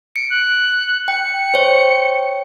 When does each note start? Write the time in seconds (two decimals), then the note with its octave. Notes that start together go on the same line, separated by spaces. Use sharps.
0.16 C#7 D7
0.30 F#6
1.08 G5 C#7
1.54 C5 C#5 G5